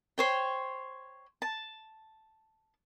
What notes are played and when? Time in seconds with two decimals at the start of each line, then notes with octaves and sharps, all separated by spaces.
0.18 C5 C#5 G5
1.42 A5